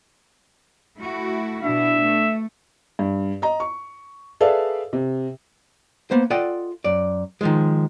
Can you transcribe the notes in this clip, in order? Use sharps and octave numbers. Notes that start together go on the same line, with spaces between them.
A3 E4 F#4
B2 D4 E4 E5
A3
G2
D#5 A#5
C#6
G#4 A4 B4 D5 E5 F5
C3
A#3 B3 C5
F4 A4 D5 D#5 F#5 G5
F#2 D5
D#3 F3 G#3